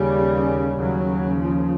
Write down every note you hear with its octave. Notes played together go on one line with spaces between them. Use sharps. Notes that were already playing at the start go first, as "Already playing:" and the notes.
Already playing: D#2 C#3 G3
D#2 C#3 F#3
F3